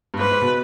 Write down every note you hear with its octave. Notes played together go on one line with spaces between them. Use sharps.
G2
G#2 B4
G#2
B2